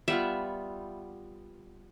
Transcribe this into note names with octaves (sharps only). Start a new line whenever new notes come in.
G3 B3 F4 E5